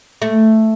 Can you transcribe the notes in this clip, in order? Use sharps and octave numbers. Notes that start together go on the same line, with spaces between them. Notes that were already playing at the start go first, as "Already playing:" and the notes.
A3